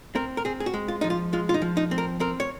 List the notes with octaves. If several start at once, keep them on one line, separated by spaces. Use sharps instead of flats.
C4 A#4
A#4
C4 G#4
G#4
F#4
G#3
F4
F3 D#4
F4
G#3 F4
F4
D#4
F3
D#4
C4
A#4
C4 A#4
C#5